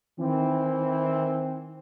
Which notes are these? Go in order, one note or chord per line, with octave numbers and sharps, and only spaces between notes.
D#3 E3 C4